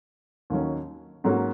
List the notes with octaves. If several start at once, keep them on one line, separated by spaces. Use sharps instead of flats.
D#2 D#3 F#3 C#4
G#2 F#3 A#3 C#4 F#4